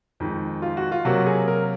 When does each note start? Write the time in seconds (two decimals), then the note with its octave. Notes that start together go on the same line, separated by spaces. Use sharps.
0.20 F2 D#3 G#3
0.62 F4
0.77 F#4
0.92 F4
1.05 C3 F#3 A#3 F#4
1.26 G#4
1.48 A#4